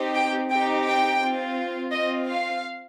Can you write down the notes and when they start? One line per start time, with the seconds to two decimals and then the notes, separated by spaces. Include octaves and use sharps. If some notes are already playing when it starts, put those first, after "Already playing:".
Already playing: C4 D#4 G4
0.15 G5
0.51 C4 D#4 G4 G5
0.86 G5
1.22 C4 F4
1.92 C4 F4 D#5
2.28 F5